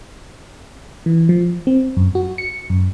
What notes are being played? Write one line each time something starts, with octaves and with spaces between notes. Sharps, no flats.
E3
F3
C4
F#2
F#4
C#7
F#2